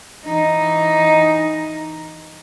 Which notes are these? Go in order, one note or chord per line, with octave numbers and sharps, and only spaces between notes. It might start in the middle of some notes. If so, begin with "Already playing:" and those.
E3 D#4